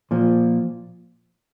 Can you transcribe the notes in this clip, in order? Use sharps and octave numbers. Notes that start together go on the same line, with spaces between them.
A#2 F3